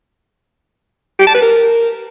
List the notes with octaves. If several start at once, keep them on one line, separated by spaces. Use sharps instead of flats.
G4
A5
B4
A#4